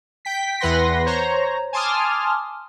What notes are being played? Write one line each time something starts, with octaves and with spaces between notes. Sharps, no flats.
G5 B6
E2 E3 B4 F#5 C6 A#6
C5 C#5 A#5
G#5 A5 C6 D6 D#6 F6